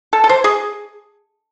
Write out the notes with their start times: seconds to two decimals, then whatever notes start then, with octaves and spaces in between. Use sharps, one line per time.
0.13 A4
0.24 A4
0.29 C5
0.44 G#4